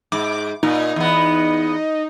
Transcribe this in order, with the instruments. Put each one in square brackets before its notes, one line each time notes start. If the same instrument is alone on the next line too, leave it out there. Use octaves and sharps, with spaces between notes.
[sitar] G#2 [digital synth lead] D6
[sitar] A#2 [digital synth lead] D#4
[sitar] E2 B3